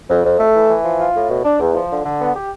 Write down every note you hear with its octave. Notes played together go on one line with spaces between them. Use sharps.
F2
F2
A3
E3
E3
F3
F4
A2
B2
D4
E2
F3
D3
D3
B3
G4